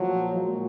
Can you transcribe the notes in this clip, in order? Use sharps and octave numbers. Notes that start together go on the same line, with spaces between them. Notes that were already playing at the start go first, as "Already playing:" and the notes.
Already playing: A#2 F3 F#3
A#2 F#3 G#3